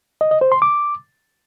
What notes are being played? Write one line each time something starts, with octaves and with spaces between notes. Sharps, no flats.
D#5
D#5
C5
C6
D6